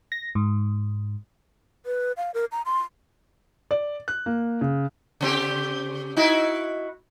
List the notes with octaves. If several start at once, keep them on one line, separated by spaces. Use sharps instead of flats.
A#6
G#2
B4
F5
A#4
A#5
C6
D5
F#6
A#3
C#3
C#3 C4 G4
D#4 E4 F#4